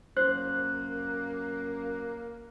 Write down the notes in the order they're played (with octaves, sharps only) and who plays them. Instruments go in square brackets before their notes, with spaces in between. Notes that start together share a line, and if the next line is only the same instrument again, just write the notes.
[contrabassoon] F#2 [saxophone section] A#3 [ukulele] C5 [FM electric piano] F#6